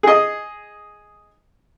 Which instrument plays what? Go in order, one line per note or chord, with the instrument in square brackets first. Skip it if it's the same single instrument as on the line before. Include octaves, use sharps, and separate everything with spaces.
[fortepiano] G#4 D#5